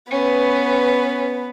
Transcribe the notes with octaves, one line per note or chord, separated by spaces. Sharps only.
B3 C#4 B4